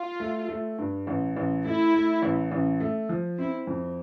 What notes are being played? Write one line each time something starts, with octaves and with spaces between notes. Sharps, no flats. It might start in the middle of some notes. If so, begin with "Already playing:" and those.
Already playing: F4
A3
A3
G2
A1
A1
A3 E4
A3
A1
A1
A3
F3
C4 E4
F2